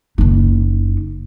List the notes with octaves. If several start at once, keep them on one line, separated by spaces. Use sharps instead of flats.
F#1 D#4